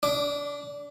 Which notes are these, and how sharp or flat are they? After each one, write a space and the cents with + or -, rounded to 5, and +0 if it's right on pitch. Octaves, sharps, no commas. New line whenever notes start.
D4 -25 D6 +0